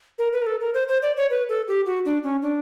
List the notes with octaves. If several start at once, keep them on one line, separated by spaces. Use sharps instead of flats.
A#4
B4
A#4
A4
A#4
C5
C5
D5
C#5
B4
A4
G4
F#4
D4
C#4
D4